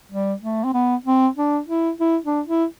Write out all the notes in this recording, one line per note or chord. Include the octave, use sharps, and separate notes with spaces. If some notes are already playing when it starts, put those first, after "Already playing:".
G3
A3
C4
B3
C4
D4
E4
E4
D4
E4